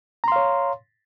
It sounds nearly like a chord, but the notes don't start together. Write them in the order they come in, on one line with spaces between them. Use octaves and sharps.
A#5 C6 F5 C#5